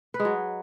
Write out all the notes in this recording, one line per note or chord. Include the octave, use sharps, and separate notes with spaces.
B4
G#3
F#3